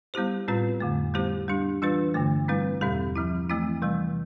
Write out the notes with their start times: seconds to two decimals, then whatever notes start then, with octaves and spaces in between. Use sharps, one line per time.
0.14 G3 B3 E4 G4 C5
0.48 A2 G3 C4 F4 B4
0.80 F2 D3 A3
1.14 G3 B3 E4 G4 C5
1.48 G3 D4 G4
1.82 E3 G3 D4 F4 B4
2.14 G2 D3 A3
2.48 G3 C4 E4 B4
2.81 E2 B2 G3 C4 G4
3.16 F3 C4 E4
3.49 E3 A3 C4 E4
3.82 C3 E3 G3